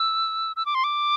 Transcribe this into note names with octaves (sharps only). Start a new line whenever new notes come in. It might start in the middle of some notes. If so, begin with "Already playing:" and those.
Already playing: E6
E6
D6
C6
D6